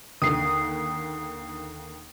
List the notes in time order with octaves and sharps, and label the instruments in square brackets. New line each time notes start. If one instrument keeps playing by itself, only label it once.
[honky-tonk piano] D#2 D3 [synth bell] D#6 C7